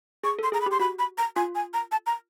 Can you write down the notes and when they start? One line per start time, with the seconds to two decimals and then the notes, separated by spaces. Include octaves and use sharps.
0.24 G#4 C#6
0.39 A4 C6
0.52 G#4 A#5
0.61 B5
0.66 G4
0.71 C6
0.80 F#4 B5
0.99 B5
1.18 A#5
1.36 F4 G#5
1.55 G#5
1.74 A#5
1.92 A5
2.06 A#5